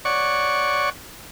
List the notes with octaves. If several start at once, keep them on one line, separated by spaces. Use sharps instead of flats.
C#5 D5 F#5 C#6